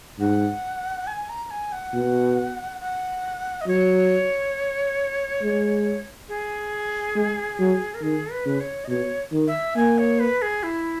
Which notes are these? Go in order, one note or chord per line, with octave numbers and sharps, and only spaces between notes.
G#2 F#5
G#5
A#5
G#5
F#5
B2
F#5
D#5
F#3 C#5
G#3
G#4
G#3
F#3
A#4
D#3 G#4
B4
C#3
C#5
D#5
B2 C#5
D#3
E5
A#3 G#5
C#5
B4
G#4
E4